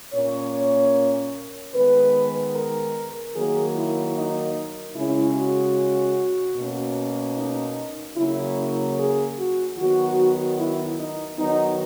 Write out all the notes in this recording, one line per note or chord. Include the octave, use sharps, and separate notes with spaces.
A#2 A#3 C#4 C#5
D#3 G#3 B3 B4
A#4
D#3 F#3 A#3 G#4
E4
D#4
C#3 G#3 C#4 E4
F#4
B2 A#3 C#4
D#4
C#3 F#3 A#3 C#4 E4
G#4
F#4
D#3 F#3 B3 F#4
E4
D#4
D#3 F#3 B3 D#4